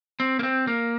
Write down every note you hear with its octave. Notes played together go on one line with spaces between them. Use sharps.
C4
A#3
C4
A#3